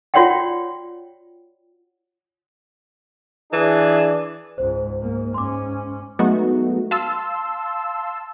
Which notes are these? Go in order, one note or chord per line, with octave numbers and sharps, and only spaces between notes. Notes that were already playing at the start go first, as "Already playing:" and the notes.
F4 F#4 C#5 D5 F#5 G5
E3 D4 G#4
C#2 G#2 C5
G#2 A#3
G#2 C#4 C6 D6
F#3 G#3 A3 B3 D#4 F#4
F5 A5 C6 E6